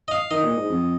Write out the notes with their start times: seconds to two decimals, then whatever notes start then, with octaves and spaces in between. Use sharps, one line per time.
0.08 D#5
0.11 F5
0.31 D#3 D#5
0.43 A#2
0.56 G#2
0.69 F2